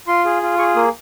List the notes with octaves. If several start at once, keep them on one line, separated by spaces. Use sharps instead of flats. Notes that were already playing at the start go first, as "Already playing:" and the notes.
F4 C6
G#4
F4
G#4 C#6
A#3 D#6